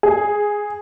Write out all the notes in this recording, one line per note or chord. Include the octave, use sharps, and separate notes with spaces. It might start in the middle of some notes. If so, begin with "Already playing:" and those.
G#4